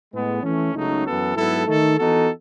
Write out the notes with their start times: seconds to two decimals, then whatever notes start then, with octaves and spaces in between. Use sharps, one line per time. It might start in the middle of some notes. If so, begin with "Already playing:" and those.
0.12 A2 G#3 B3
0.42 E3 A3 C#4
0.74 C#2 C#3 F#3 A3 D#4
1.05 F#2 E3 B3 F#4 A4
1.36 G#2 F#3 B3 E4 A4
1.67 D#3 A3 D#4 A4
1.98 E3 B3 D#4 F#4 A4